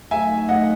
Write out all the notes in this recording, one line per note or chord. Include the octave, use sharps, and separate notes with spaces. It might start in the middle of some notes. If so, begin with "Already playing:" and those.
F#3 A3 D#4 E5 G#5
D#5 F#5